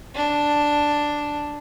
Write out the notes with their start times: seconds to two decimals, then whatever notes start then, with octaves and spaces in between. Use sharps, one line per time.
0.15 D4